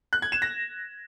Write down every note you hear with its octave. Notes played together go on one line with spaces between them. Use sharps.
F#6
G#6
E7
A#6